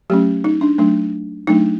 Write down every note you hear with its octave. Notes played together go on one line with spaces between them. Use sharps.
F#3 A3 C#4 G4
D#4
D4
F#3 A3 D4
F#3 A3 D4 D#4